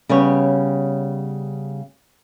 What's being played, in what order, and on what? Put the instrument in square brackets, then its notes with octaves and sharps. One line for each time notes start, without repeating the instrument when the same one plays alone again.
[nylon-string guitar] C#3 G3 B3 C#5